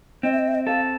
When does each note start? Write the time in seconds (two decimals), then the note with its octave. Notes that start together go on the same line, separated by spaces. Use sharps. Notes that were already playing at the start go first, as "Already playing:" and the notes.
0.23 C4 D#5
0.32 E5
0.39 D#5
0.48 E5
0.55 D#5
0.67 A4 F5